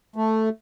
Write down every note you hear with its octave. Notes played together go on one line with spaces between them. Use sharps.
A3